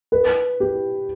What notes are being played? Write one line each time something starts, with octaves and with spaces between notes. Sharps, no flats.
B4
G4